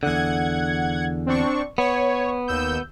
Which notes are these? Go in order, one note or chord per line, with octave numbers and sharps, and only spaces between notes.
E2 D3 F#5 G#6
C4 D4 C#6
B3 C#5
D#2 E6 G6